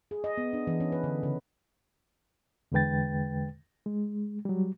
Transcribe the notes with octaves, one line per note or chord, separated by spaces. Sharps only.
G#4
D#5
B3
D4
E3
C#4
B4
D3
C#3
E2 D3 G#3 B4 G5 A6
G#3
F#3 G3